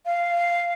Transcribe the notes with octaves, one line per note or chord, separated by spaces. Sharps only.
F5